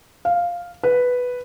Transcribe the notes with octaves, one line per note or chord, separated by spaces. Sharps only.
F5
B4